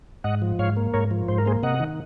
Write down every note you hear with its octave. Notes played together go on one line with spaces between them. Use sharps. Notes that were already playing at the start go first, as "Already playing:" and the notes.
G#2 D#5 F#5
F3
G#2 C#5 F5
A#3
G#2 A#4 C#5
F3
G#2 C5
A#4
A#3 G#4 C5
C3 D#5 F#5
D#3